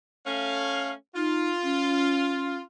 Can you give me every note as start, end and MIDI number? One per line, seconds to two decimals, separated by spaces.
0.26 0.93 57
0.26 0.93 61
0.26 0.93 77
1.16 1.49 63
1.16 2.61 65
1.63 2.55 61